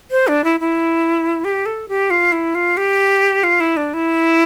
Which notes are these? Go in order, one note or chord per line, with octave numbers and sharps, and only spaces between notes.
C5
D4
E4
E4
G4
A4
G4
F4
E4
F4
G4
F4
E4
D4
E4